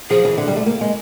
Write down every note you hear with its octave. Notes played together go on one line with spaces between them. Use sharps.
F3 G#4
E3
D3
G3
A3
A#3
G#3